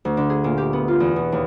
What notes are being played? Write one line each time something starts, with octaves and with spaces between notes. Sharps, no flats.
D2
D3
G#4
A#2
G4
B3
F4
E2
B2
D#2